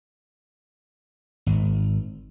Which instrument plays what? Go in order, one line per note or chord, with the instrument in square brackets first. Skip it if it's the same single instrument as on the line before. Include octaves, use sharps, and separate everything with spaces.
[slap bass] G#1